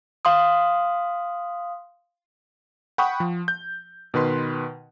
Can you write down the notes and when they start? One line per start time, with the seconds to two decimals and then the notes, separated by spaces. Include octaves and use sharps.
0.25 F5 C6 D#6
2.98 F#5 G5 B5 C#6 D#6
3.20 F3
3.48 G6
4.14 B2 D#3 B4 C6